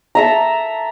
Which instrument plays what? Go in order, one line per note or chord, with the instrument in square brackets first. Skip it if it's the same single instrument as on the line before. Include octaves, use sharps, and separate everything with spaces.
[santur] A4 E5 A#5